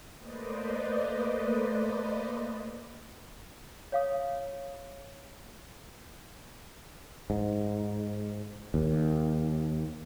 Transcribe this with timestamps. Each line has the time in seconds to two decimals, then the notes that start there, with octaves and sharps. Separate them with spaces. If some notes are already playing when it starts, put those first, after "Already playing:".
0.19 A3 A#3 B4 C5 D5 D#5
3.92 C#5 F5 D#6
7.30 G#2
8.74 D#2